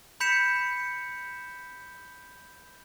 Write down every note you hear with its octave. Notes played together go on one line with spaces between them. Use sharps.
B5 G6 B6 C#7 E7